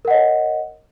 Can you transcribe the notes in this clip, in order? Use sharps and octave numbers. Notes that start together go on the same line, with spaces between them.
A#4 C#5 D#5 F#5